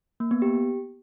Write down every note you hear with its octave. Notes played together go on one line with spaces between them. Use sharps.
A#3
B3
G4